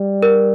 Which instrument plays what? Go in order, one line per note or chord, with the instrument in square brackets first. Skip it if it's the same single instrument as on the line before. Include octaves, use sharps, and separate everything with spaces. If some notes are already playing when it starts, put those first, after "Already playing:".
Already playing: [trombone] G3
[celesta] A#4